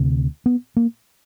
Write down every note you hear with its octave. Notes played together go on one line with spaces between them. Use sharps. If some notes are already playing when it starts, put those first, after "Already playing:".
Already playing: D2 C3
B3
A#3